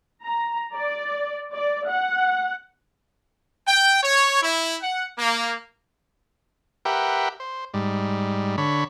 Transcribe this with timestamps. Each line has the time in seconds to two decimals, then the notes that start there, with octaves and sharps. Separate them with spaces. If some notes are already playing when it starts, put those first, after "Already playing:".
0.23 A#5
0.75 D5
1.53 D5
1.88 F#5
3.66 G5
4.02 C#5
4.41 E4
4.82 F#5
5.18 A#3
6.85 G4 A#4 B4 E5 F#5 G5
7.40 C5
7.74 G#2 G3
8.58 D3 C#5 B5